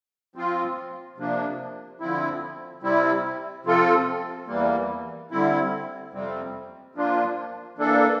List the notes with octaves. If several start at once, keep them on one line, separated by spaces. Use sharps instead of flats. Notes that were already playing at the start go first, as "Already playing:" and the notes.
F3 C4 F4
C3 F3 A#3 D4
D3 F3 C4 E4
C3 G3 C4 E4
C3 F3 C4 F4 A4
E2 E3 G3 A#3
D3 G3 C4 E4
F2 C3 G3 C4
F3 A#3 D4 F4
E3 A#3 D4 A4